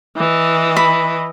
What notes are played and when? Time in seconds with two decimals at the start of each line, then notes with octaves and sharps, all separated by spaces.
0.17 E3 D#5
0.76 B5